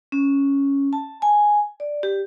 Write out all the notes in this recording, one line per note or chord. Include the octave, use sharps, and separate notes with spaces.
C#4
A5
G#5
D5
G4